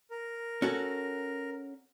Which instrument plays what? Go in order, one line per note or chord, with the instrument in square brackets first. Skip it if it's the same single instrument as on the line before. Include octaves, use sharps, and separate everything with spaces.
[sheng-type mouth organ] A#4
[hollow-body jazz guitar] C#4 F#4 A4